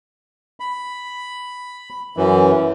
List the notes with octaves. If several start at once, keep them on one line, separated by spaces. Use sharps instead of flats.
B5
F#2 E3